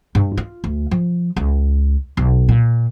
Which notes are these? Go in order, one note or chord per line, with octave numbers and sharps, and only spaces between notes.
G2
F4
D2
F3
C#2
B1
A#2